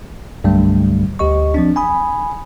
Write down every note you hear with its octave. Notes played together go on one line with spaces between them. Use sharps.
C2 G2 D3 F#3 G3 A3
D2 G4 D#5 C#6
F3 C4 D4
G#5 B5 D#6